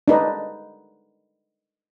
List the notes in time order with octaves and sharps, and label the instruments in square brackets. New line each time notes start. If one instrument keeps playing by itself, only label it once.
[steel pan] D4 D#4 B4